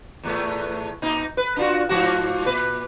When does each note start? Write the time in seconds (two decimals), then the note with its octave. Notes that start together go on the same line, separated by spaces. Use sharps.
0.23 E2 A2 A3
1.02 A#2 D#4
1.37 B4
1.56 D4 F4 F#4
1.89 G#2 F3 F#4
2.46 A#2 B4